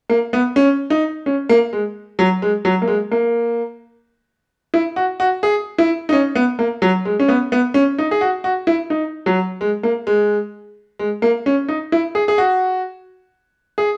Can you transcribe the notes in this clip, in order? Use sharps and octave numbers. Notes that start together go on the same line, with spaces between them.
A#3
B3
C#4
D#4
C#4
A#3
G#3
F#3
G#3
F#3
A#3
G#3
A#3
E4
F#4
F#4
G#4
E4
D#4
C#4
B3
A#3
F#3
G#3
C#4
B3
B3
C#4
D#4
G#4
F#4
F#4
E4
D#4
F#3
G#3
A#3
G#3
G#3
A#3
C#4
D#4
E4
G#4
G#4
F#4
G#4